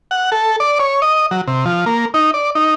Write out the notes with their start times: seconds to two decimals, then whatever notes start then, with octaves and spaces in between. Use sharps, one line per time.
0.11 F#5
0.32 A4
0.60 D5
0.79 C#5
1.02 D#5
1.31 F#3
1.48 C3
1.65 F3
1.86 A#3
2.14 D#4
2.34 D5
2.55 D#4